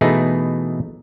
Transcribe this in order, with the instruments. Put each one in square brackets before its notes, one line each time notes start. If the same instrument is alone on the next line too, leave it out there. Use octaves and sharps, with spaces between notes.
[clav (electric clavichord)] B2 E3 A3 D#4 E4 G#4